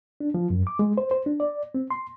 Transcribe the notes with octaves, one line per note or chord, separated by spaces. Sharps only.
D4
F3
F#2
D6
G#3
C5
C5
D4
D5
C4
C6